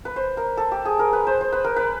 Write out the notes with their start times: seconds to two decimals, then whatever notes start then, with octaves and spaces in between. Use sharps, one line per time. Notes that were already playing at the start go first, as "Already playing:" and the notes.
0.05 B4
0.16 C5
0.37 A#4
0.57 A4
0.72 G4
0.85 G#4
0.99 A#4
1.13 B4
1.27 C5
1.41 C5
1.52 B4
1.64 A#4
1.76 B4